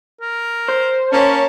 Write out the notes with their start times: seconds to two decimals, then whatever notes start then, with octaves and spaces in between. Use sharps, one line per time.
0.21 A#4
0.68 C5
1.12 A#3 C#4 A5